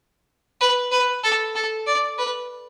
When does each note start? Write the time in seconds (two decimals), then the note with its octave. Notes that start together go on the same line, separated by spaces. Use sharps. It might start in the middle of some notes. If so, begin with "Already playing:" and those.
0.61 B4
0.91 B4
1.23 A4
1.55 A4
1.87 D5
2.18 B4